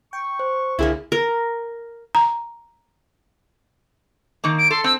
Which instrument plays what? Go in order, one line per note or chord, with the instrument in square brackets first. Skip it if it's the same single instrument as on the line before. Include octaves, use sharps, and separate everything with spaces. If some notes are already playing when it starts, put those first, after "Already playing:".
[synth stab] G5 [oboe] C#6
[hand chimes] C5
[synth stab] C2 D3 G#4 [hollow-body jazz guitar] A#3 E4
[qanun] A#4
[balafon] A#5
[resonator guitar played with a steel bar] D#3 A#3
[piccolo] D7
[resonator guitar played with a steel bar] A4 [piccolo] C6
[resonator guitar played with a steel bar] C4 [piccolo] E6